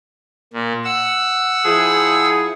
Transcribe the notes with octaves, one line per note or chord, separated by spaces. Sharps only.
A#2
F#5 E6
F3 E4 G#4